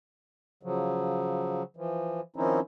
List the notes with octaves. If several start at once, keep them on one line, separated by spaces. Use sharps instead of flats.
C#3 F3 F#3
E3 F3
D#3 F3 C4 C#4 D#4 E4